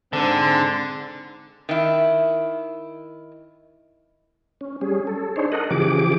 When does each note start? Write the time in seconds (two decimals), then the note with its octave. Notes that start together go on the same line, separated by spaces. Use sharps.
0.13 G#2 D3 C4
1.69 D#3 E4
4.61 C#4
4.81 G3 C#4 G#4
5.07 A4
5.36 D4 D#4 G#4 C5 C#5
5.52 A4 A#4 D#5 F#5
5.71 C#3 E3 F3 G4 G#4 D6